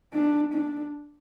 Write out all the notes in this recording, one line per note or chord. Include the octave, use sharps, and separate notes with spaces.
D4
D4